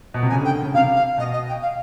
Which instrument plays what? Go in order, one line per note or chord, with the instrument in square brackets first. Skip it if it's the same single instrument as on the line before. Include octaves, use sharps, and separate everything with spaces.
[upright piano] B2
C3
[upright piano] C#3 [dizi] G#5
[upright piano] D3
[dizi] G5
[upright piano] D3
C#3
[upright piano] C3 [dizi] F5
[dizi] F5
[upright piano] B2 [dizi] D#5
[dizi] D#5
G5
F5